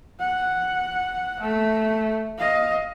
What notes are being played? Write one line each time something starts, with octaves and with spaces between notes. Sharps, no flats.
F#5
A3
D#5 F5